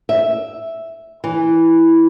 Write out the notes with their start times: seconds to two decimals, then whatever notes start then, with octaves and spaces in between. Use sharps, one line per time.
0.09 E5
1.24 E3